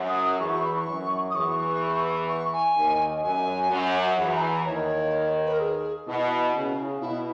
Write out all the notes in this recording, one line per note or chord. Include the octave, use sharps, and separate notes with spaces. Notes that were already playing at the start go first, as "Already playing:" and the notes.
Already playing: F#2 F#3
D#6
E2 E3 C#6
C#6
B5
C#6
F#2 F#3
D#6
E2 E3 C#6
C#6
G#5
D#2 D#3
F#2 F#3 G#5
F#2 F#3
E2 E3 F#5
A#5
G#5
A#5
D#2 D#3 C#5
B4
A#4
G#4
B2 E4
C#3
B2 E4